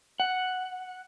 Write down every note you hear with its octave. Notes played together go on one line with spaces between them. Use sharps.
F#5